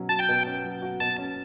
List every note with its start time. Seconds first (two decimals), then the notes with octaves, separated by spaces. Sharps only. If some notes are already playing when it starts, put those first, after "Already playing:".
Already playing: B2 F#3 C#4
0.09 F#4 A5
0.19 G5
0.29 B2
0.46 C#4
0.64 F#3
0.82 F#4
1.00 B2 A5
1.18 C#4